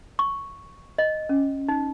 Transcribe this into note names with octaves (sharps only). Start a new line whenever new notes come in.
C#6
D#5
C#4
D#4